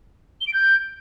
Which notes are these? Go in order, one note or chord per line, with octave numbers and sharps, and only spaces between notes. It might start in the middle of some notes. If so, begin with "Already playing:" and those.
G7
D7
G6